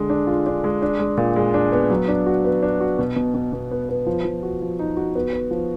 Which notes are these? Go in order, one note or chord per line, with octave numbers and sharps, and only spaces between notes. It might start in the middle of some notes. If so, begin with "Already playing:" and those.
Already playing: D3 G#3
D4
F4
D4
G#3
D4
G#3
A#2
G#3
D4
B3
F#3
D4
F#4
B3
D4
F#4
B2
B2
B2
B2
B3
B3
F3
F3
F#4
F3
D#4
F#4
B3
B3
F3